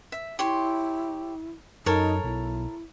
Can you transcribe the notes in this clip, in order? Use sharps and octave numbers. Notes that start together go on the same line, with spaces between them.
E5
E4 G4 C#5 C6
F#2 D#4 A4 A#4 C#5
B1 E4